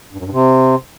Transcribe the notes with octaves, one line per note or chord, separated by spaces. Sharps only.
G2
F#2
G2
C3